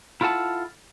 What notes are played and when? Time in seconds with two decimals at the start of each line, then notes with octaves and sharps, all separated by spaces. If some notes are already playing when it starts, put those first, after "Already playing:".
0.21 E4 F4 A4 F#5 A5